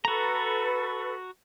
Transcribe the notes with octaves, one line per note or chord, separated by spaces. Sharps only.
F#4 A4 B4 A#5